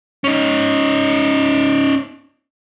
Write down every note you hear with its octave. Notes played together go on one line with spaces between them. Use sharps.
C#4 D#4